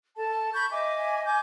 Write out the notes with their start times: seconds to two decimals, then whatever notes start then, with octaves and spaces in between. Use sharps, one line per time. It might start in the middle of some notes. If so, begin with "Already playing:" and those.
0.16 A4 A5
0.54 B5 C#6 G6
0.71 D#5 E5 G#5 D6
1.25 G#5 D6 G6